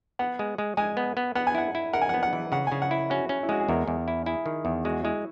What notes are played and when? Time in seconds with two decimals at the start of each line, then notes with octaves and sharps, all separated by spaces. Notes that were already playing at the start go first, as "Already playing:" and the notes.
0.19 B3 F#5
0.39 G#3
0.58 G#3
0.77 G#3 G#5
0.97 B3
1.17 B3
1.35 B3 F#5
1.47 G#5
1.55 E4 F#5
1.75 E4
1.93 A#4 F#5
2.02 G#5
2.09 F#5
2.14 B3
2.23 F#5
2.33 E3
2.52 C#3 F#5
2.67 C#3 G#5
2.82 F#5
2.91 E4
3.10 C#4 F#4
3.29 C#4
3.43 E4
3.49 G#3 F#4
3.60 G#4
3.68 E2 A#4
3.87 E2
4.08 E4
4.26 E4 G#4
4.46 D#3
4.65 E2
4.85 G#3 F#4
5.03 G#3 E4